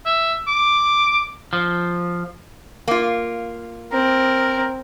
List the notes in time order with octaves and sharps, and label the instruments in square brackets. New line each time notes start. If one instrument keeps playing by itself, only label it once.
[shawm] E5
D6
[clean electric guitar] F3
[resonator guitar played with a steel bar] A#3 F4
[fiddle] C4 [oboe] A#4